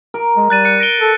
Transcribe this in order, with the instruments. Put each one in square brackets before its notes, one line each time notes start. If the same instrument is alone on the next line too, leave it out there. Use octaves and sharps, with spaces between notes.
[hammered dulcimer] A#4
[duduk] G#3
[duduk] G3 [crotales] F#6 A6 D#7
[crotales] F#6 C#7 D#7
A#6 D7 G7
[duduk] A4